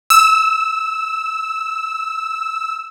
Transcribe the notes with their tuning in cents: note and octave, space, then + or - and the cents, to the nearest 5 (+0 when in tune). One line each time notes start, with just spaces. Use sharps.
E6 -5